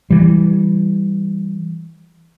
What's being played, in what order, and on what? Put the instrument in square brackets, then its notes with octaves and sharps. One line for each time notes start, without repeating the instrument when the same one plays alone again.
[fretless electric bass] E3 G3